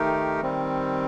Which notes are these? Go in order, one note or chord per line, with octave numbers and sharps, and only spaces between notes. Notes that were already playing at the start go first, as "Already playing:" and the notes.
Already playing: D#3 A3 D#4 G4 A#4
D#3 G3 C4